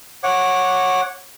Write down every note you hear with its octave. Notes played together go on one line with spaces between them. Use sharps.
C#5 F#5 D6